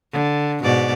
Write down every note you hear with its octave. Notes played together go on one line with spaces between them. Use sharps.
D3
G#2 B2 D5